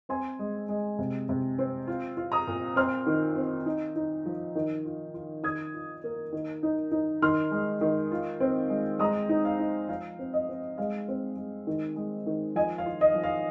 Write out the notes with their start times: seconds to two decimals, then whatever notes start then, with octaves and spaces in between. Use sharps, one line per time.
0.09 C4 G#5 C6
0.39 G#3
0.69 G#3
0.99 C3
1.29 C3
1.59 C4
1.87 F4
2.17 F4
2.32 A#5 D#6
2.47 A#2
2.76 C4 C6 F6
3.06 D#3
3.36 C4
3.66 D#4
3.96 D#4
4.26 F3
4.55 D#3
4.85 F4
5.14 F4
5.43 D#3 D#6 G#6
5.74 F4
6.04 A#3
6.32 D#3
6.63 D#4
6.92 D#4
7.22 D#3 C6 F6
7.51 G#3
7.81 D#3
8.11 F4
8.40 C4
8.70 G#3
8.99 G#3 A#5 D#6
9.29 D#4
9.45 F5
9.59 D#4
9.88 F3 F5
10.19 C4
10.33 D#5
10.49 C4
10.78 G#3 F5
11.08 C4
11.37 G#3
11.67 D#3
11.96 G#3
12.26 D#3
12.55 F3 D#5 G#5
12.78 F5
12.86 F4
13.01 D#5
13.15 F3
13.23 F5